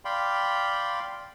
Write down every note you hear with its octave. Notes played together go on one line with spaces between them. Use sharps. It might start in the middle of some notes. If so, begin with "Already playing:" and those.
D5 F5 G5 B5 C6